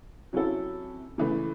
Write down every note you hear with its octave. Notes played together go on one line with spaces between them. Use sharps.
C3 F#3 C#4 E4 A4
C#3 E3 A3